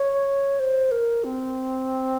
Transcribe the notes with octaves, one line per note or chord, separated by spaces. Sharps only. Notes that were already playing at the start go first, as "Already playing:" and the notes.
Already playing: C#5
C5
A#4
C4